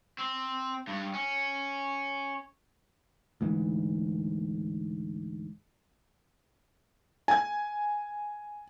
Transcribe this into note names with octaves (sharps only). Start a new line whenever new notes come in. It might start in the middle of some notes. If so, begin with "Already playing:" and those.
C4
G2
C#4
D2 G#2 E3
G#5 G#6